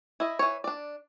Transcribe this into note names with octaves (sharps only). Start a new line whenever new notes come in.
E4 D#5
E3 F#3 C#5
D4 D5